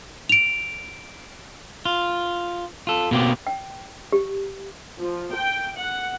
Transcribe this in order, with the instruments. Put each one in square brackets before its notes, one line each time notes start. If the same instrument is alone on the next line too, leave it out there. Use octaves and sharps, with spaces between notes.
[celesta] D7 F7
[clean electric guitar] F4
F4 A4
B2 A#3 C4 G4
[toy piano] G5
G4
[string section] F3
G5
F#5